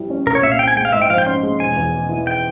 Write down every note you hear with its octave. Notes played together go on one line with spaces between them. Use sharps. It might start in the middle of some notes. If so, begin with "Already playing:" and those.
Already playing: G2 F3 G3 E4
C#4
C2 A#4
C#5
A#2 E5
F5
C4 G5
G#5
G#3 G5
F5
G#2 E5
G5
F3 F5
G5
C#4 C6
G#3
E1 G#5
E2
E1
E3
G5